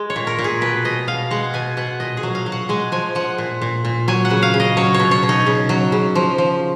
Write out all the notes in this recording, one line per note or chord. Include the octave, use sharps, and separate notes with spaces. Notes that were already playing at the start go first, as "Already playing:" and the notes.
Already playing: G#3
C#5
A#2
A#4
A#2
G#4
B2 B4
B2 D#5
B2 F5
G#3 F#5
B2 G#5
B2 F#5
A#2 D#5
G#4
F#3
F5
F#3
F#5
G#3 G#5
F3 G#5
F3 F#5
A#2
A#2
A#2
F#3 G#5
F#5
C#3
F5
C#3
D#5
F#3 C#5
C#5
B2
C#5
B2
D#4
C#3
F#3
C#3
F3
F3